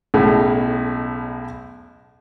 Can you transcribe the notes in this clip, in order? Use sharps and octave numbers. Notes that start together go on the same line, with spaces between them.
B1 A2 C#3 G#3